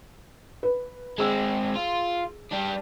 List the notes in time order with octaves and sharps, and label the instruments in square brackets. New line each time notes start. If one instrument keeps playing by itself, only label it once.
[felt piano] B4
[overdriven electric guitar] G#3 C4 [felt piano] G#4 E6
[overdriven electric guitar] F4
G3 D4